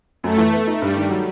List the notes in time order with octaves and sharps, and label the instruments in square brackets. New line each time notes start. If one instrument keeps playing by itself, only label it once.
[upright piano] F#2 [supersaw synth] A3
[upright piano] E3
B3
D#4
[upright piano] G2 [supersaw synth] G3
[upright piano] D#3
F#3